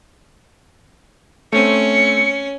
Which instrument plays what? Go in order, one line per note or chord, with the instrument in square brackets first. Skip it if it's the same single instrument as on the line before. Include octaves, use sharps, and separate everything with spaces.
[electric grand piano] A3 C4 [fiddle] C#4 [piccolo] C#7